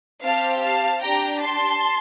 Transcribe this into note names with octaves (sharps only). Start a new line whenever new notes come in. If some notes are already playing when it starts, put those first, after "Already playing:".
C4 G4 F5 A5
F5 A5
D4 G4 G5 A#5
A5 C6